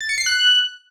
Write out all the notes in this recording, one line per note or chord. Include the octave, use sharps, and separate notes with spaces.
A6
C#7
C7
F#6